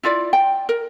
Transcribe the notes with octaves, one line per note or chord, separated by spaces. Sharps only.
E4 F4 D5
G5
A#4